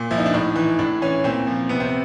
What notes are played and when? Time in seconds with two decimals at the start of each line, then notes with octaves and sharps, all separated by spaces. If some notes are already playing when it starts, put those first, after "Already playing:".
Already playing: A#2
0.11 F3 E4
0.18 D#4
0.26 D4
0.34 A2 D#4
0.56 E3
0.79 A2 D4
1.02 E3 C#4
1.24 A#2 C4
1.47 F3
1.69 C3 B3
1.80 C4